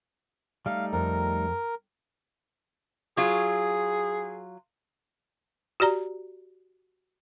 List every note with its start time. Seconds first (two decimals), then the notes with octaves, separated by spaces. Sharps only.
0.66 G3 A3 D#4 F5
0.93 F2 A#4
3.17 F#3 F4 G#4
5.80 F#4 G4 D5 A#5